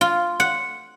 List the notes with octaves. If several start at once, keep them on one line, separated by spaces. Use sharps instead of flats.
F4
F#5